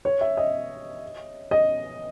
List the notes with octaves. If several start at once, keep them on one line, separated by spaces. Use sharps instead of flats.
C#5
E5
D#5
D#5